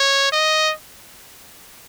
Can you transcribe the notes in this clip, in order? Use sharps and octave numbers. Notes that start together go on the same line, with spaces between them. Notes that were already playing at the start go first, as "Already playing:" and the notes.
Already playing: C#5
D#5